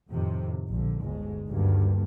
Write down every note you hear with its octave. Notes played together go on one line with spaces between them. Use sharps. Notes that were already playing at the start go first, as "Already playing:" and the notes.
F2 A2 C3 D#3
A#1 A#2 D3
G1 D2 G#2 G#3
D2 G2 D#3 A#3